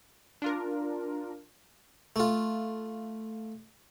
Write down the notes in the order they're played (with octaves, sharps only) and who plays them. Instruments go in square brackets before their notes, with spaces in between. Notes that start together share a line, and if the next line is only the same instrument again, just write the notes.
[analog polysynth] D4 F4 A#4
[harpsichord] A3 F4